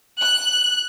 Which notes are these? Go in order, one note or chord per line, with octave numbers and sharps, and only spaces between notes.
F#6